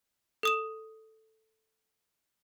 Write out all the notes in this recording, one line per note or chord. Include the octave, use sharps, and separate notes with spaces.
A4 D#6 E7